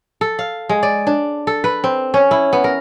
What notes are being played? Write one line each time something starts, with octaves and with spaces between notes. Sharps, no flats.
A4
F5
G#3
D5
D4
A4
B4
C4
C#4
E4
B3
A#4